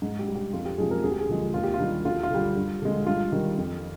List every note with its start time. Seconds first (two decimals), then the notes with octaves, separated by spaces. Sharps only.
0.02 G#2
0.19 G4
0.28 G3
0.35 G4
0.53 F2 F4
0.65 G4
0.78 C3 F3 G#3 G#4
0.91 A#4
1.04 D2 G#4
1.11 G4
1.19 G#4
1.29 D3 F3 G#3
1.54 D#2 F4
1.64 G4
1.74 F4
1.80 D#3 G3
2.05 D2 F4
2.23 F4
2.31 D3 G3
2.56 G2
2.82 D3 G#3
3.06 G2 F4
3.32 D#3 G3
3.58 F2